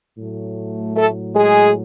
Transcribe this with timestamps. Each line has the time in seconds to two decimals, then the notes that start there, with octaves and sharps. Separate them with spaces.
0.18 A2 F#3 A3
0.96 A3 A4
1.35 G#3 G#4